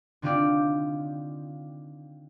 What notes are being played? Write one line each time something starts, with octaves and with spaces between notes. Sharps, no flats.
D3 D#3 C4 F4 G4 D5